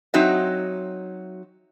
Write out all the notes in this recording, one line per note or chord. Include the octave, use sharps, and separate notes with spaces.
F#3 C4 D#4 F#4 D#5 E5